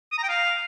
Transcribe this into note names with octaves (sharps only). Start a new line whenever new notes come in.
D#6
A#5
G5
F5